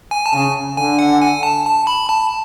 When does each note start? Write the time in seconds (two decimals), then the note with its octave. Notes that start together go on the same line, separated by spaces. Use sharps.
0.11 G#5
0.26 A5
0.33 C#3 G#5
0.77 D3 G#5
0.99 F#5
1.22 G#5
1.43 A5
1.65 A5
1.87 B5
2.09 A5